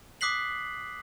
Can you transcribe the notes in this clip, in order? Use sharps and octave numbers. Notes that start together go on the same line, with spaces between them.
D6 D#6 F#6 B6 C7 F#7